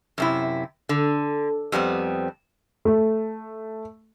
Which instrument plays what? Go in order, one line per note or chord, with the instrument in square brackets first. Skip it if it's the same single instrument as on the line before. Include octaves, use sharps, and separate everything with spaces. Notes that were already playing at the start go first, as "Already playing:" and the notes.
[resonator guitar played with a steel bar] F#2 C3 E4
D3
F2 G3 B3 C4
[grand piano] A3